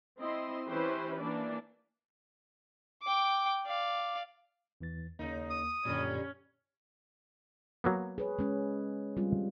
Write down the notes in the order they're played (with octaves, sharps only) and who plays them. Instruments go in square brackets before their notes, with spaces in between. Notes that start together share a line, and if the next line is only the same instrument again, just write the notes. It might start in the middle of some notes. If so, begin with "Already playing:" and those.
[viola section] C4 E4 D#5 C6
E3 C#4 E4 G4 B4 C5
E3 A#3 D4 D5
[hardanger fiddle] G5 D6
D5 F5
[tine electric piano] E2 E3 A6
[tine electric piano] D#2 A#3 [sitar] C#3 D#4
[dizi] D#6
[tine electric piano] F#2 A#2 [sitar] D3 G3 [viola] C#4
[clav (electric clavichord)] F#3 A#3 B3
[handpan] G#4 B4 C#5
G#3 C#4
G3 C4 F4